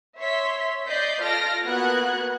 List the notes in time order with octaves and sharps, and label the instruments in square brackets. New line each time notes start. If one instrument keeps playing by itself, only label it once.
[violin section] C#5 E5 C6 B6
D5 D#5 G6 B6 C7
F4 A4 F6 A#6 D7
A#3 B3 F#4 F#6 G#6